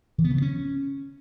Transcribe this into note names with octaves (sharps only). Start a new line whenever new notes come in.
E3
B3
C#3
B3
C#4